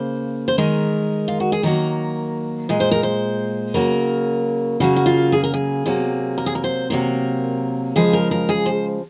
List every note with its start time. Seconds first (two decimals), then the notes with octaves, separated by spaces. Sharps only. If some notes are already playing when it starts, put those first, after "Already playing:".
Already playing: C#3 A#3 C5
0.48 C5
0.58 D#3 G#3 A#4
1.28 F4
1.40 F#4
1.52 G#4
1.63 D#3 F#3 A#3 A#4
2.69 A#2 G#3
2.80 C5
2.91 A#4
3.03 C5
3.74 C#3 F#3 A#3 A#4
4.80 C#3 F#3 A#3 F#4
4.96 F#4
5.06 F4
5.32 G#4
5.44 A#4
5.54 G#4
5.86 C3 F#3 A#3
6.38 A#4
6.46 G#4
6.55 A#4
6.64 C5
6.90 C3 F#3 A#3 A#4
7.96 C#3 F3 G#3 G#4
8.13 A#4
8.31 A#4
8.49 G#4
8.66 C5